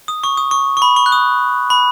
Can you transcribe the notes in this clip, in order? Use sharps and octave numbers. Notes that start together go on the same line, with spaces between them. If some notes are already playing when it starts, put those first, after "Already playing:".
D#6
C#6
D#6
C#6
C#6
B5
C#6
F#6
D#6
B5